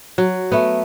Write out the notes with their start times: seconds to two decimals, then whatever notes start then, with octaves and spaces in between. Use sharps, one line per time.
0.18 F#3
0.52 A3 B3